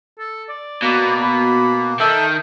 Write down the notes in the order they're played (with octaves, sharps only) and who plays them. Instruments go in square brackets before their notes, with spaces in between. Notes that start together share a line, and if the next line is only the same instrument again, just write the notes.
[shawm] A4
D5
[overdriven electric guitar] B2 [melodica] A#3
[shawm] B5
[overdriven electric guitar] D#3 [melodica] A4 E5 [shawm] G5